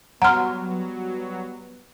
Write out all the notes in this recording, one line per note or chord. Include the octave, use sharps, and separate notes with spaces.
F#3 G3 B3 F#5 A#5 C6 F6